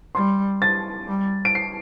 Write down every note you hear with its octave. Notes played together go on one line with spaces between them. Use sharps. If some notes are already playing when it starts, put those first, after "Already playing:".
G3 C6
A6
G3
D7
C7